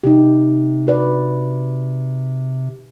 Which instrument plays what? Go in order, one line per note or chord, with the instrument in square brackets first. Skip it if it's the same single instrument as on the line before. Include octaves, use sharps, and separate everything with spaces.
[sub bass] C3 [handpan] D#4 G4
[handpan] F#4 B4 D5